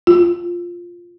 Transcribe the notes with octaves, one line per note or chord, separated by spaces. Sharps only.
F4